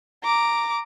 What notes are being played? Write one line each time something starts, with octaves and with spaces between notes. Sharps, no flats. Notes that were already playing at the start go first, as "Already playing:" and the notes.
A#5 D6